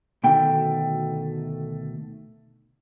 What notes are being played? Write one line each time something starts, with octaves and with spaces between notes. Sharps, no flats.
D2 B2 D#3 A3 G5